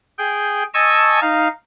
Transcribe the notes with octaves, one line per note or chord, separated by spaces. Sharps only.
G#4 G5
D#5 G#5 A5 C#6 E6
D#4 F5